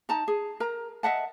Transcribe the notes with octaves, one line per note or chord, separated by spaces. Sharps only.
D#4 A5 A#5
G#4
A#4 A#5
D#5 E5 F#5 A5